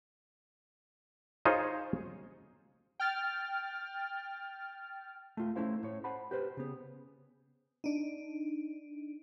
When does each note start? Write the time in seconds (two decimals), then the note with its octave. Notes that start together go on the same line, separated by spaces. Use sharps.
1.45 D#4 F4 G#4 C5 C#5
3.00 G5 F6 A6
5.37 A3 F4
5.55 A3 C#4 E4 C5 F5
5.83 A2 C#5
6.04 C5 F#5 A5 B5
6.31 G4 B4 C5
6.57 C#3 B3
7.84 D4 D#4